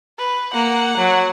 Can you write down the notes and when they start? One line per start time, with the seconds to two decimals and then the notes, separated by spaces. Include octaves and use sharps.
0.19 B4
0.53 A#3 F#5
0.97 F#3